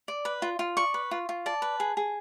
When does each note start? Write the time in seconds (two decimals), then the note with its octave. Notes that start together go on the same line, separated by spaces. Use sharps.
0.08 D5
0.25 B4
0.42 F4
0.59 F4
0.77 D5 C#6
0.94 B4
1.11 F4
1.29 F4
1.46 D5 A5
1.62 B4
1.80 G#4
1.97 G#4